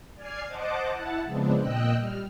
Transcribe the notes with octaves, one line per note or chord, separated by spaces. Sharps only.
D5 G#5 F6 G#6 C7
C5 D#5 F#5 A5 D6
E4 F#5 A5
C#3 F3 G#3 B3 C4 D4
A#2 D#5 G5 E6 F#6
G3 F6